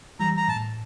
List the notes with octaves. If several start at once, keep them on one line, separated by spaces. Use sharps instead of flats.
E3 G3 A#5
A#5
A2 A5